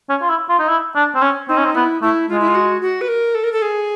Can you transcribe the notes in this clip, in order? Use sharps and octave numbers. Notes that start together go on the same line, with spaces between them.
C#4
F4
E4
F4
D#4
E4
D4
C4
C#4
C4 D#4
C#4
C4
B3 E4
A3 E4
G#3 F4
E4
F4
F#4
F#4
B4
A#4
A4
A#4
A4
G#4